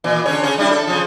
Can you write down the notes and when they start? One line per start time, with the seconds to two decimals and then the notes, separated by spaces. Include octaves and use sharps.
0.04 A#2 E3
0.26 D3 C#4 C#5
0.43 C#3 C#4 C#5
0.58 G3 D4 E4
0.71 A4
0.87 C#3 F3